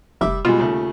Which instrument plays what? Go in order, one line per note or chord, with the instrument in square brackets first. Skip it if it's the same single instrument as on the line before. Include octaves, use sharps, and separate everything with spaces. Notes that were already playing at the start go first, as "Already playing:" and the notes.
[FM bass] F1 [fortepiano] G3 E5 D6
[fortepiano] B2 G3 G#3 [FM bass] F4
[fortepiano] D#2 C#3 A3